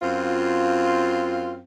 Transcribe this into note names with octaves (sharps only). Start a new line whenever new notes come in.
F#2 C4 F4